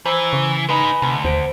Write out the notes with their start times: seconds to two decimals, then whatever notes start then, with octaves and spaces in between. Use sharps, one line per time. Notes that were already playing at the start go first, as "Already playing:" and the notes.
0.06 E3 C5 A#5 E6
0.33 C#3 C#6
0.69 G#3 D#4 B4 G#5 B5
1.02 D2 C3
1.24 D#2 C5 D7